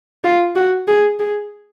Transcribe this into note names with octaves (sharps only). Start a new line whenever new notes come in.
F4
F#4
G#4
G#4